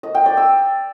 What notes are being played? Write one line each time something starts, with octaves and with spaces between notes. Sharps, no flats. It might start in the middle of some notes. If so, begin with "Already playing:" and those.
D#5
G5
D5
E6